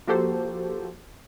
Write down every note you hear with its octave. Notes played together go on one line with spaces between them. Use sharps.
F3 A#3 F#4 G4 A4 C5